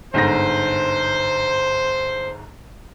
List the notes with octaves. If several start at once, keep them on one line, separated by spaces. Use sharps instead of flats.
G1 G#2 C5 A#6